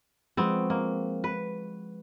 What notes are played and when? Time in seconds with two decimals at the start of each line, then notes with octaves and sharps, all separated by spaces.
0.37 F3 G#3 B3 C4 F#4
0.70 A#3
1.24 B4